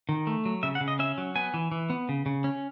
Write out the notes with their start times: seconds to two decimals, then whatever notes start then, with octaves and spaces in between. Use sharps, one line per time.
0.09 D#3
0.27 A3
0.45 F#3
0.63 C#3 E5
0.75 F#5
0.81 C#3
0.88 D#5
0.99 C#4 E5
1.18 F#3
1.35 B3 G#5
1.54 E3
1.72 E3
1.90 B3
2.09 C#3
2.26 C#3
2.44 C#4